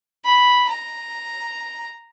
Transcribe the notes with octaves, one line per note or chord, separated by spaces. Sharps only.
B5
A#5